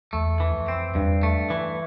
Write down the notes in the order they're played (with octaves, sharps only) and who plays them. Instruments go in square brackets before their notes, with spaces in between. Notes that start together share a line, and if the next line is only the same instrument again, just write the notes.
[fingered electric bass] E2 [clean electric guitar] A3
[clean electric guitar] E3
[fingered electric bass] F2
[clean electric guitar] C4
[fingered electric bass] E2 [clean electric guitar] G2
[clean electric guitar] A3
E3